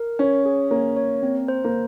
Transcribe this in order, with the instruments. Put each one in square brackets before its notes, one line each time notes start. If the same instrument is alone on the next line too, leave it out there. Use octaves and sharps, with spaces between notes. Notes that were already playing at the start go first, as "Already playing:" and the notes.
Already playing: [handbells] A#4
[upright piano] C#4 [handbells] C#5
[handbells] G#4
[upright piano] A#3 [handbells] C#5
[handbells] C#5
C4
C5
[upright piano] A#3